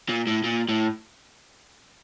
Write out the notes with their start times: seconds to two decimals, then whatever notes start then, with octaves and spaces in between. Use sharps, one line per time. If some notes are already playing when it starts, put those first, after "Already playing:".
0.09 A#2
0.27 A2
0.44 A#2
0.69 A2